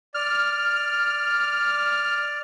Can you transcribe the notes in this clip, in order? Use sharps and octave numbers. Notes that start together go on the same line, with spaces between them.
D5 F6